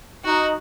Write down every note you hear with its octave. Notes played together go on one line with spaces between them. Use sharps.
D#4 F#4